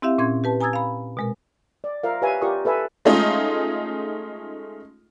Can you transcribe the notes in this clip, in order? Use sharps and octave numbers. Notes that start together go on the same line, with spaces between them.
C4 E4 G4 E5 F5
A#2 C#4 C6 G#6
G4 B4 A5
G#5 A#5 D#6 E6 G#6 A6
F5 B5
B2 G#3 A#4
D5
F4 A#4 C5 E5 F5
G4 B4 C#5 E5 F5 G#5
F4 G4 A#4 D5 C#6 D#6
A4 B4 E5 G#5 B5
G#3 A3 C#4 D#4 F4 G#4